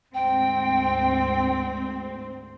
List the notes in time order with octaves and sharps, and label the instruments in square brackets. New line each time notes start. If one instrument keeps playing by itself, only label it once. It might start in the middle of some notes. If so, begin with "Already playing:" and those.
[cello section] D2 G#2 C4 [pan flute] G5